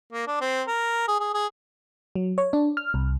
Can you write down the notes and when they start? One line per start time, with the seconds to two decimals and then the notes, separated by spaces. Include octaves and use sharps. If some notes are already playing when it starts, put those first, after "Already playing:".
0.12 A#3
0.27 D4
0.41 C4
0.68 A#4
1.08 G#4
1.20 G#4
1.34 G#4
2.16 F#3
2.38 C#5
2.53 D4
2.77 F6
2.94 C2